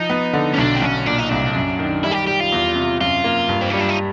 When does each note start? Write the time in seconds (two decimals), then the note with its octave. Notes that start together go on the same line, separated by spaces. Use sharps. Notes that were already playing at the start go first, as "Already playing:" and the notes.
Already playing: F3 D#4
0.10 B3
0.33 D3
0.54 C#4
0.58 B1 D4
0.75 C4
0.82 B1 C#4
1.06 A#2 D4
1.19 D#4
1.30 C2 D4
1.54 F#2
1.79 D#3
2.04 G3 E4
2.11 G#4
2.15 G4
2.27 G3 G4
2.40 F4
2.52 E2
2.76 C3
3.01 F#2 F4
3.24 A#3
3.49 G2
3.61 C4
3.70 G3 C#4
3.79 D4
3.89 D#4